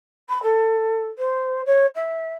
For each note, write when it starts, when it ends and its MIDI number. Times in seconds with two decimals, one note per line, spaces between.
0.29 0.42 83
0.42 1.07 69
1.18 1.62 72
1.66 1.86 73
1.95 2.34 76